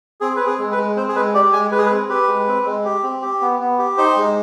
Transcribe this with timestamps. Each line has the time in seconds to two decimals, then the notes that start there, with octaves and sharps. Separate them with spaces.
0.21 C4 G#4
0.36 C4 B4
0.47 G#4
0.59 G#3
0.72 B4
0.78 G#3
0.96 C4 C5
1.09 G#4
1.16 G#3 B4
1.34 G4 D5
1.53 G#3 G#5
1.71 G#3 B4
1.78 G#4
1.86 B4
1.91 C4
2.09 G4 B4
2.28 G#3
2.47 C4
2.66 G#3
2.85 G4
3.03 C4
3.22 G4
3.41 B3
3.60 B3
3.79 G4
3.98 D#4 C5
4.17 G#3